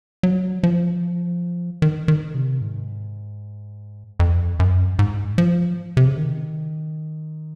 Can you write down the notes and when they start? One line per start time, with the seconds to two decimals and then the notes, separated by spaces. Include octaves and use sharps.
0.23 F#3
0.63 F3
1.82 D#3
2.08 D#3
2.35 C3
2.61 G#2
4.20 F2
4.60 F#2
4.99 G#2
5.38 F3
5.97 C3
6.07 C#3
6.18 D#3